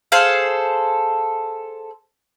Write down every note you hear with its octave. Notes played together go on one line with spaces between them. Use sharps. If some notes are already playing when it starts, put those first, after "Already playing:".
G#4 A4 C5 F5